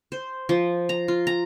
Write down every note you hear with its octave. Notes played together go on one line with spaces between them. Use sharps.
C5
F3
A#5
F4
A#5